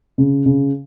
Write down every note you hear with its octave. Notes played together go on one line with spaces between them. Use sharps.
C#3
C#3